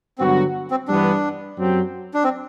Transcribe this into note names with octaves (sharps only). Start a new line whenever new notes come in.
G2 D3 F#3 B3 C4 F#4
C4
G2 E3 B3 D4
F#2 F#3 C4 G4
D4
C4